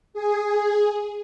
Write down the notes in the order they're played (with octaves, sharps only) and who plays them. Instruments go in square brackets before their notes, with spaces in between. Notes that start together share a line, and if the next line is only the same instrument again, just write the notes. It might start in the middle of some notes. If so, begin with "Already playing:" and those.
[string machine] G#4